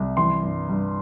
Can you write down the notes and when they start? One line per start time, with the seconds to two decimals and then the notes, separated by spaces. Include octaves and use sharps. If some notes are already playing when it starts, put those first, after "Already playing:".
Already playing: C2
0.17 E3 C6
0.43 G2
0.69 G2